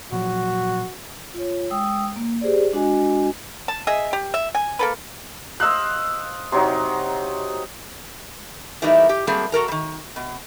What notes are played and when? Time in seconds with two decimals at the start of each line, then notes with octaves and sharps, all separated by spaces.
0.12 A#2 F3 F#3 F#4
1.34 F4 C#5
1.70 G#3 G5 D#6 E6
2.16 A#3
2.41 G4 G#4 C5 D5
2.73 G#3 D4 F#4 D#5 G#5
3.68 A5
3.87 G#4 D#5 E5
4.13 G4
4.34 E5
4.55 G#5
4.79 A#3 A4 B4
5.60 C5 D#5 F5 E6 F#6
6.52 C3 F#3 D#4 C6
8.82 E3 G3 A3 A#3 D#4 E4
9.09 G4
9.27 F#3 G3 A3 A#3 C4 G#4
9.52 F#4 A4 A#4 A#5
9.68 D#3 G3
10.16 B2